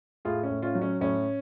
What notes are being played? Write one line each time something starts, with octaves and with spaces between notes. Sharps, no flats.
A2 F4 G#4
C#4
A2
C#4 F4
F#3
C#4
A2 C#4